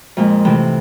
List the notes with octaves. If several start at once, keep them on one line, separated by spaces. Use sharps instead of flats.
F2 A#2 G#3
A2 C3 E3